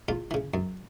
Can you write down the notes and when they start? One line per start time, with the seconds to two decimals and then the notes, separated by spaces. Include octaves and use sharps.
0.08 E2 F4
0.31 C#3 E3
0.54 F#2